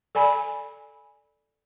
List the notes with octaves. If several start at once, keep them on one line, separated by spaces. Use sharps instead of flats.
A4 D5 G#5 B5